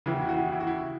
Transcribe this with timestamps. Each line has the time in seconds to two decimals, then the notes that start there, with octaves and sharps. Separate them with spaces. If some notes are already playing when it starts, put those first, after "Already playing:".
0.06 D#2 C#3 E3 E4
0.14 F#4
0.21 E4
0.29 F#4
0.37 E4
0.45 F#4
0.52 E4
0.60 F#4
0.67 E4